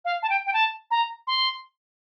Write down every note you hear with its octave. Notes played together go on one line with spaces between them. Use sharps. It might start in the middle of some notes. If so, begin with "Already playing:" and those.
F5
A5
G5
G5
A5
A#5
C6